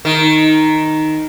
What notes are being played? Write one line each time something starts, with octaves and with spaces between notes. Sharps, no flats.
D#3